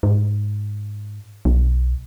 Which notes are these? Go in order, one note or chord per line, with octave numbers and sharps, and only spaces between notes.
G#2
B1